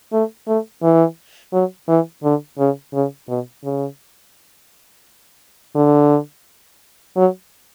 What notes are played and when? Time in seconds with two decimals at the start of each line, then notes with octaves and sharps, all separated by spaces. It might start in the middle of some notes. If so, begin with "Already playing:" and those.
0.12 A3
0.47 A3
0.82 E3
1.53 F#3
1.88 E3
2.23 D3
2.58 C#3
2.93 C#3
3.28 B2
3.64 C#3
5.75 D3
7.16 F#3